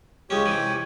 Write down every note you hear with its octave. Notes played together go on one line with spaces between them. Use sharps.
C#2 G#3 C#4 G4 C#5
C3 E3